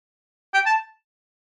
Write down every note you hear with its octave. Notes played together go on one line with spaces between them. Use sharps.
G5
A5